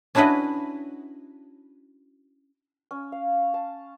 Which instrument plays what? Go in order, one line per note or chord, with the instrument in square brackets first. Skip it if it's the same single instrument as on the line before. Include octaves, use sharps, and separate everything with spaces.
[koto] C#4 D4 E4 F#4 B4 D#5
[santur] C#4
F5
A5